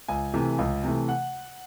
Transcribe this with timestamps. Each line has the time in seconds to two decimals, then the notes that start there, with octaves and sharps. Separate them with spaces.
0.08 C#2 G#5
0.34 C3 E3 A3
0.58 C#2
0.84 C3 E3 A3
1.09 F#5